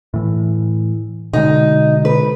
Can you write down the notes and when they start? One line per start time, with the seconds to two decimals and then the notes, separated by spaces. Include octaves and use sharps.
0.14 A2 E3
1.33 B2 D3 G#3 D#4
2.05 B4